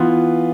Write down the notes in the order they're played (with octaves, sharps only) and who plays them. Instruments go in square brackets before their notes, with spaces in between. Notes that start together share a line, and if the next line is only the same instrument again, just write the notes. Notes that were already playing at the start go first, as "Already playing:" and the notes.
Already playing: [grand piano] E3 B3 F4